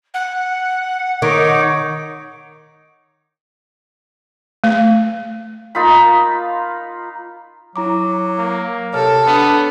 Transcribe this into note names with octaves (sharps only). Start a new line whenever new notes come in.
F#5
D#3 D#4 C#5 D6
A3
A#3 D#4 F4 B5
F#3 E4 A#5 D6
A#3
C3 A4 C#5 F6
B3 D4